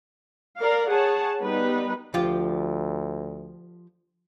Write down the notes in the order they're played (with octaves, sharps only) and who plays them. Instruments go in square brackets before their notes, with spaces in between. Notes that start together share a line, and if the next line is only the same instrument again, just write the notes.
[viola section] A#4 D5 F5
G#4 C#5 F#5 A5
G3 B3 D#4 B4
[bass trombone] D2 [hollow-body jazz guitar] F3 F4 G4